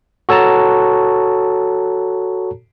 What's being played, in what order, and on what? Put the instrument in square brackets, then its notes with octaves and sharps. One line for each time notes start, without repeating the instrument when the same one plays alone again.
[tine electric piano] F#4 A4 C#5 A5 A#5